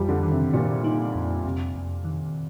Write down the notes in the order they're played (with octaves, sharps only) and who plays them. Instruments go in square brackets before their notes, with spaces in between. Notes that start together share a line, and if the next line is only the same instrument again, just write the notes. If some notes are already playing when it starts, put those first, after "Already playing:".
Already playing: [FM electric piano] F2 [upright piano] F3 G3
[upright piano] D3
[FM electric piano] D#3
[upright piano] C3
[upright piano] A#2 [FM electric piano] A#3
[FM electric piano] D#4
F2
[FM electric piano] F2 [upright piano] C3
[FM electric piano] F2
D#3